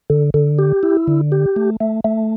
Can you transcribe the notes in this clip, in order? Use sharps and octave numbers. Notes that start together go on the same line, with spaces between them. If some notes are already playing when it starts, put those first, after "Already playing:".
D3
D3
G4
E4
D3
G4
A3
A3
A3